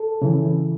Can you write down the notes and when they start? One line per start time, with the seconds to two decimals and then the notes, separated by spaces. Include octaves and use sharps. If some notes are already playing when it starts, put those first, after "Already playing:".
Already playing: A4
0.22 C#3 E3